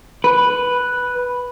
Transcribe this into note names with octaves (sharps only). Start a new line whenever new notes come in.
B4